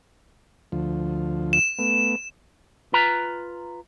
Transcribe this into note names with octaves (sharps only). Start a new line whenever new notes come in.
D2 F3
E7
A3 B3
F4 B4 A#5